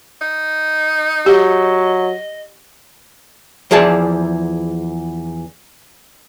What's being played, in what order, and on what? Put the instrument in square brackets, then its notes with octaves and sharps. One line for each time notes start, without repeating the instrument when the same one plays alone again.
[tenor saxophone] D#4
[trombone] F#3 [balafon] G4 [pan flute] D#5
[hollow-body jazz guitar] E2 F3 G#4 D5 A5